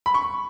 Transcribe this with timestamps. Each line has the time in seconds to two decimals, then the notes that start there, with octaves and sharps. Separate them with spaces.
0.06 B5
0.14 C#6